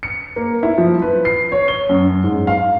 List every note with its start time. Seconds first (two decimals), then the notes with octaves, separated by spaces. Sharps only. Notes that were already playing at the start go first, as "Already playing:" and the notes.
0.03 C#7
0.36 A#3
0.63 E4
0.78 F3
1.02 B4
1.25 C7
1.52 C#5
1.68 G7
1.89 F#2
2.24 G#2
2.47 F5